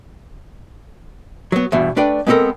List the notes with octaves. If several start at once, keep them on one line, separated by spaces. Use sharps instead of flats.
F#3 B3
E2 G2 B2
A3 D4 B4 D5 G5
G#3 B3 C4 G4 A4 A#4